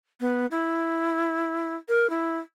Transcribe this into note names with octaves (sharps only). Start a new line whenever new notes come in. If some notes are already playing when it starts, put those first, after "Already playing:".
B3
E4
A#4
E4